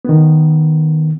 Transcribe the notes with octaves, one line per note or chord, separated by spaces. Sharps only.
D#3 B3